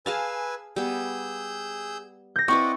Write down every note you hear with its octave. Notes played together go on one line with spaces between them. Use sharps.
G#4 B4 F5 G#5 A5 E6
G3 B3 G#4 E6 G6
G6 A#6
C4 E4 B4 D5 D#5 F#5 C#6